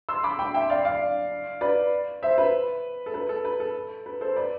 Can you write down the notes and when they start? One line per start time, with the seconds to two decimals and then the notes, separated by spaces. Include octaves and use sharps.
0.09 C6 E6
0.23 B5 D6
0.39 G5 B5
0.54 E5 G5
0.70 D5 F5
0.85 D5 F5
1.61 B4 D5
2.22 C5 E5
2.38 B4
3.06 A4
3.14 B4
3.29 A4
3.45 B4
3.60 A4
4.06 B4
4.21 A4 C5
4.36 B4 D5